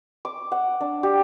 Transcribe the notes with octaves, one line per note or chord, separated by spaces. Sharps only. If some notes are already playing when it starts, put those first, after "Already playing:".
D6
F#5
D4
G4